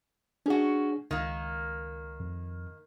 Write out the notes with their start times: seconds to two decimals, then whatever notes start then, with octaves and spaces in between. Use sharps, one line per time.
0.46 C#4 D4 F#4 G#4
1.11 C#2 D#3 A#3
2.20 F2